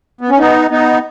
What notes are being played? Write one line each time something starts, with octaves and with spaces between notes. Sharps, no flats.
B3
C#4
B3 D#4
B3 D#4